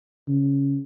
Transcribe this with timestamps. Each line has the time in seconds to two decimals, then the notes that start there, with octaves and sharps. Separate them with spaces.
0.28 C#3